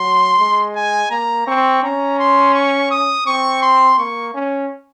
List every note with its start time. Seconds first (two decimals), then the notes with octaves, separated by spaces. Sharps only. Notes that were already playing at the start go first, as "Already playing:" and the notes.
Already playing: F#3 C6
0.39 G#3
0.76 G#5
1.11 A#3 A#5
1.47 C4 C#6
1.83 C#4 A#5
2.19 C6
2.54 C#6
2.91 D#6
3.26 C4 C#6
3.62 C6
3.98 A#3 C#6
4.34 C#4